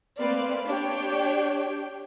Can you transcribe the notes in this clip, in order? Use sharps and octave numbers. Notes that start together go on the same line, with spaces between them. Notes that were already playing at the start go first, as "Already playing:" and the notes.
A3 A#3 C4 B4 D5 F5
D4 G4 C#5 G5